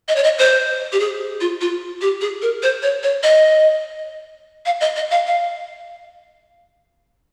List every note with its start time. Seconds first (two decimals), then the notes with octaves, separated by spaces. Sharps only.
0.08 D#5
0.16 C#5
0.24 D#5
0.38 C5
0.92 G4
1.00 G#4
1.41 F4
1.61 F4
2.01 G4
2.21 G#4
2.42 A#4
2.63 C5
2.82 C#5
3.03 C#5
3.23 D#5
4.66 F5
4.81 D#5
4.96 D#5
5.11 F5
5.27 F5